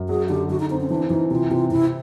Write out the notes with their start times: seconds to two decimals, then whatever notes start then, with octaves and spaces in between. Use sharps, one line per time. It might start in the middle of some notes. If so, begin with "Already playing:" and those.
Already playing: F#2
0.09 F#3 G#4
0.29 D3 G4
0.50 D3 F#4
0.60 D#4
0.70 C4 D#4
0.80 C#4
0.90 E3 D4
1.10 E3 D#4
1.31 C3 F4
1.50 C3 F4
1.71 C3 E4